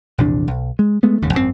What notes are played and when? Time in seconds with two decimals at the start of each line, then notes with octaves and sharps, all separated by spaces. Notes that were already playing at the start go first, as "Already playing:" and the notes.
0.18 A#1 E2 C3 D4
0.48 B1
0.79 G#3
1.03 G#3 A3 B3
1.22 D#1 D#2 G#2 C#3
1.33 G#1 F#2 C3 C4